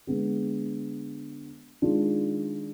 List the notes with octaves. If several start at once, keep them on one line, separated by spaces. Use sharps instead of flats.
D3 G#3 B3
D#3 G#3 D4 F4